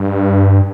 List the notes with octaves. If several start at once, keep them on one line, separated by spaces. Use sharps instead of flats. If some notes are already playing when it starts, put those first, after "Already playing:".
Already playing: G2